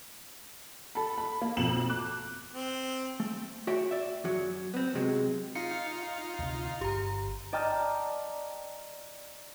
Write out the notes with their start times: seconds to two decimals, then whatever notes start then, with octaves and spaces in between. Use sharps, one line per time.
0.95 A4 B5
1.18 B5
1.41 A#3
1.57 B1 F2 E7 F#7
1.90 D6 F#6
2.52 C4
3.20 A3
3.67 F#4 C#5 E5 G5
3.91 D5 E5
4.24 F#2 F#3
4.74 B3 C4
4.95 C3 F#3 G#3
5.55 D#4 F4 F5 C#7
6.39 D2 C3
6.81 G1 G4 A#5
7.52 D5 D#5 G5 A5 A#5 F6